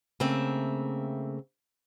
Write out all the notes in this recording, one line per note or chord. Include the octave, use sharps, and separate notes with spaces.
C#3 A3 A#3 C4 E5